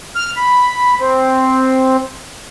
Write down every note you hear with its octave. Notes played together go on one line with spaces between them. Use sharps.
F6
B5
C4